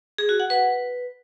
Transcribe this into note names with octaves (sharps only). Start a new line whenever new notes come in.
G#4
F#4
F#5
B4